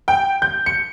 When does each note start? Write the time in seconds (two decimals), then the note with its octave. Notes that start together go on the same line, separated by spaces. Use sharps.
0.08 G5
0.42 G6
0.66 C#7